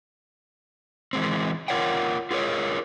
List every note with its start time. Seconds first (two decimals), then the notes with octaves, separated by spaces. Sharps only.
1.13 E3 G#3 C4
1.68 F4 A#4 C#5 F#5 G5
2.31 F4 G#4 A#4 C#5